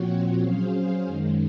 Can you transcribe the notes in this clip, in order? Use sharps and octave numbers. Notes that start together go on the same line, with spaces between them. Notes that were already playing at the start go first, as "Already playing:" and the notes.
Already playing: A#2 F3 C4 F#4 C#5
F#3 C#4 G#4 C5 F5
F#2 D#3 G#3